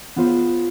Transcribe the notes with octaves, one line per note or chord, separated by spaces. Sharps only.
B3 F4 C5